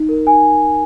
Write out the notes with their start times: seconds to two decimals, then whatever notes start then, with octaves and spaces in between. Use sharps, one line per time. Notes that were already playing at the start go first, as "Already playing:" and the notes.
Already playing: D#4
0.09 A#4
0.26 D#4 G#5